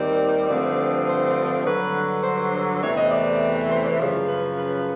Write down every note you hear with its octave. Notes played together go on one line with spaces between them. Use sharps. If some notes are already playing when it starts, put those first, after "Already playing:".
Already playing: D#2 D#3 G3 C4 D5
G2 D3 F3 A3 C4 D5
C5
G2 D3 F#3 B4
C5
E2 C3 E3 A3 C4 C#5
D#5
D5
C5
D5
F#2 C#3 F3 C5
B4
B4